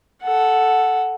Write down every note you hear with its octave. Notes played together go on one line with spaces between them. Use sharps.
A4 F#5